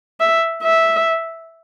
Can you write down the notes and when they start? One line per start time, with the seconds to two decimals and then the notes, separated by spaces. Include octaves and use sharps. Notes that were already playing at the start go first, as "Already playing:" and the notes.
0.20 E5
0.63 E5